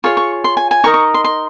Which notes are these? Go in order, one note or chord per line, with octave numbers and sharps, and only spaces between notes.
F4 G#4 C#5 C#6
C#6
C6
G#5
G#5
D#4 A#4 D#5 C#6
C#6
C6
C6